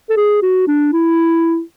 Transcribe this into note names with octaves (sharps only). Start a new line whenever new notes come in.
A4
G#4
F#4
D4
E4